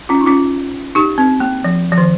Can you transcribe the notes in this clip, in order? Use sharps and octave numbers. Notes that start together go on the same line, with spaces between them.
C#4 F4
D#4
C#4 F4
D#4 G4
C4
A#3
F3
F3
D#3